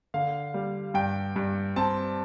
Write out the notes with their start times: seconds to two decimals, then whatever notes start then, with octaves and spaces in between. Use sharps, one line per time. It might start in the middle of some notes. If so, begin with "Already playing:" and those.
0.14 D3 F5
0.54 G3
0.94 G2 G5
1.36 G2
1.76 C4 A5